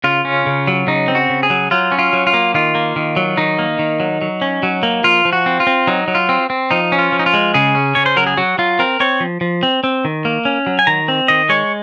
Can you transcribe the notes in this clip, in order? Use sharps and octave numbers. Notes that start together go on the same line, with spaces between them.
C#3 F4
C#4
C#3
F#3
C#3 D#4
C4
F#4
C#3
G#4
F#3
F#3 F4
C#4
F4
F#3
F4
A#3
D#3 F4
A#3
D#3
F#3
D#3 D#4
A#3
D#3
F#3
F#3
C#4
F#3
A#3
F3 F4
F3
F#4
C4
F4
C4
F#3 D#4
F#3
F4
C4
C4
F3 D#4
C#4
F4
F3
D#4
F4
G#3
C#3 G#4
C#4
C#3 C#5
C5
F#3 A#4
G#4
F#3 F#4
F#3 F4
C4 A#4
C4 C#5
F3
F3
C4
C4
D#3
A#3
C#4
F#3
G#5
D#3 A#5
C4
D#3 D#5
G#3 C#5